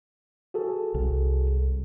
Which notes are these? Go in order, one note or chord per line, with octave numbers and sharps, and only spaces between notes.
F#4 G#4 A4
C2